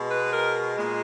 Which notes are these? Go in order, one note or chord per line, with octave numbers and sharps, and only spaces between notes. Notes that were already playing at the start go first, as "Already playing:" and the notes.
Already playing: B2 G#3
B4
A#4
A#2 G#3